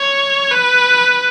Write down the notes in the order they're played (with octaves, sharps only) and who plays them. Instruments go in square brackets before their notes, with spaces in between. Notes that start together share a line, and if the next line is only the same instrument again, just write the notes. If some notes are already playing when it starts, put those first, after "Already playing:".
Already playing: [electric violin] C#5
B4